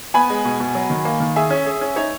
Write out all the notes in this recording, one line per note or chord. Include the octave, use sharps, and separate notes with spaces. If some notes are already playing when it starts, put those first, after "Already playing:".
B3 G#5 B5
G#3
B2
B2
F#3
D#3
A#3
D#3
G#4 E5 G#5
C#4
G#4
C#4
D#4 C#5 E5